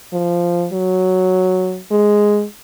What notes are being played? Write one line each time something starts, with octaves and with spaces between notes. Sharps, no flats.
F3
F#3
G#3